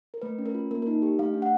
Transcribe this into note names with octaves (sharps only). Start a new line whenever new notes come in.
A#4
A3 B4
C#4
A#4
F4
A#3 A#4
D#4 A#4
G4
A3 F5
D4
F#5